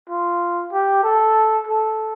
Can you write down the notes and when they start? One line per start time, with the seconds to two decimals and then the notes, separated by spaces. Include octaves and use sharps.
0.09 F4
0.72 G4
1.03 A4
1.67 A4